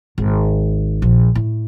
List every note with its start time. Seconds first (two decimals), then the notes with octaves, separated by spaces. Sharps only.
0.18 G#1
1.02 A#1
1.35 A2